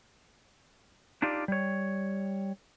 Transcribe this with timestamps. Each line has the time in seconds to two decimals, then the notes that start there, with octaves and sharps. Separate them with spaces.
1.22 D4 D#4 F4 G4 D5
1.48 G3 C#5